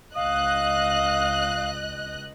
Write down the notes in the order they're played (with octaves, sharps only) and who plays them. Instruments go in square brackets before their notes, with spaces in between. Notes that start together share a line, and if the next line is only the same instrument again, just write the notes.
[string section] C#2 D#5 F#6 [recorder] F5 [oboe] D#6